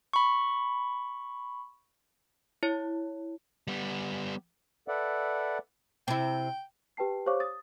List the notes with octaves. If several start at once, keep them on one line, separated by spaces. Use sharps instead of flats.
B5 C#6
E4 C#5
G3 B3
A4 B4 D5 E5 F#5
C3 E4 G5
G4 B4 G5 A5 C7
G4 C5 C#5 F5 C#6 D6
D#6 A6